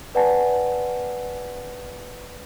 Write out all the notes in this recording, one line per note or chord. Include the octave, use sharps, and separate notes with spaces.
B4 D5 F#5 G#5 A5